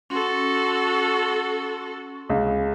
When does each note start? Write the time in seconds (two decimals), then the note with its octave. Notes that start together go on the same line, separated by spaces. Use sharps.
0.10 C#4 F#4 A4 C6
2.30 C#2